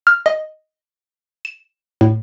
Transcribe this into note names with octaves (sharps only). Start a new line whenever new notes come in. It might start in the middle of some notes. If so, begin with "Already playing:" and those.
F6
D#5
E7
A2